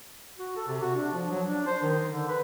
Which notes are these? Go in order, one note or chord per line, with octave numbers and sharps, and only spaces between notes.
F#4
A4
C3
F#4
D4
F3
F#3
D4
C5
D#3
D3
B4